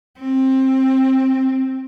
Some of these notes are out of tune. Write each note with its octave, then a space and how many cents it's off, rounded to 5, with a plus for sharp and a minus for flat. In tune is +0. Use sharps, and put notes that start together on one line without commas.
C4 +15